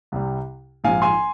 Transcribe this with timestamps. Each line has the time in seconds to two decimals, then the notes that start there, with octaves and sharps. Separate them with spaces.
0.12 C2 C3 G3
0.84 A#1 G#2 F3 F5 G#5
1.02 G#5 C6